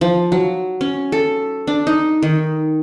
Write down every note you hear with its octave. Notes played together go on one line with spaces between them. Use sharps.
F3
F#3
C#4
A4
D4
D#4
D#3